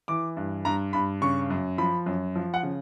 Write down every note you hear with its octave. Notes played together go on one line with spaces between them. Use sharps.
E3 D6
G2
G2 A#5
G2 B5
C#3 C#6
F#2
F3 B5
F#2
F3
F#5
C#3